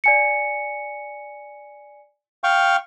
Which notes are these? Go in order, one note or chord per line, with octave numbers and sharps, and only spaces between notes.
D5 G#5 C#7
F5 G5 C#6